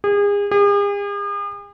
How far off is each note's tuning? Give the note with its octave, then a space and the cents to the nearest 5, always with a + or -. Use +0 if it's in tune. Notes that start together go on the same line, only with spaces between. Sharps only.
G#4 -35
G#4 -45